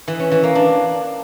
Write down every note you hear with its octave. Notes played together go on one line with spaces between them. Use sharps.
E3
C#4
E3
A#3
D4